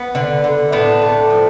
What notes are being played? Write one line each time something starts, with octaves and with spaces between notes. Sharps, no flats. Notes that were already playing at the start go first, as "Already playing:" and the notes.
Already playing: B3
D3
D3
A2 B3 D4
A3
F3